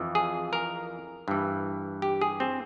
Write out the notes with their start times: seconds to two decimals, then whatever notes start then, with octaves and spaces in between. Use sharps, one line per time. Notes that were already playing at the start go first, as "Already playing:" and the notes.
Already playing: F2 E3
0.15 G#4
0.53 A#4
1.28 G2 E3
2.02 G4
2.22 G#4
2.40 C4